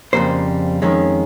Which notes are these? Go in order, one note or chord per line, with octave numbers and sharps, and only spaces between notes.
F2 C#3 G3 A#3 C5
F2 D#3 G#3 C#4